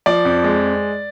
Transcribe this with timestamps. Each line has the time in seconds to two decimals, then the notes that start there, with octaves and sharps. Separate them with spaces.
0.06 F3 D5
0.25 F2
0.44 G#3